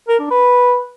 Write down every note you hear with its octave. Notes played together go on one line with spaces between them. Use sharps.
A#4
D4
B4